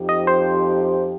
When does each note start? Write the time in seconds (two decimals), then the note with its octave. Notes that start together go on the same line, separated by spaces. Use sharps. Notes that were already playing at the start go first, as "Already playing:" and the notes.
Already playing: F2 F3 D#4 G4
0.09 D#5
0.27 C5